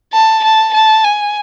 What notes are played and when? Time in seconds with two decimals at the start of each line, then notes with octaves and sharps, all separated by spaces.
0.13 A5
0.44 A5
0.73 A5
1.04 G#5